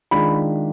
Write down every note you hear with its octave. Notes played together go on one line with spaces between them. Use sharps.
D#3 G#3 D4 F4 B5